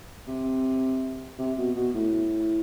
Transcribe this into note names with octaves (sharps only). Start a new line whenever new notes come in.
C3
C3
B2
B2
A2